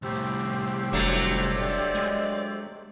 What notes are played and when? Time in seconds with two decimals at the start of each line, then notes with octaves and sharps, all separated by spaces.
0.02 C2 A2 G4 C5 E6
0.93 F1 F#3 A3 D4
1.57 C#5 D5
1.95 G#3